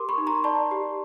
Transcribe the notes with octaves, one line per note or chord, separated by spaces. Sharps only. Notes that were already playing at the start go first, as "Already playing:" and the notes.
Already playing: G4 A#4 C6 D6
B5 C#6
D#4
A#5 C6
D5 A5 B5
G4